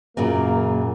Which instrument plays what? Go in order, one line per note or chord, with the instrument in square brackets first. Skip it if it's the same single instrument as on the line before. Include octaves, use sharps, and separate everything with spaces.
[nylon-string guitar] F#2 A#2 C#3 [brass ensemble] A#3